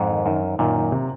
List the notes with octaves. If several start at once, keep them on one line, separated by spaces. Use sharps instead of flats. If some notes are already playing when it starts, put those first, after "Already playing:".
Already playing: F2 G#2
D#3
F#2 D#3
D#3
F#2 A#2 D#3
D#3
C3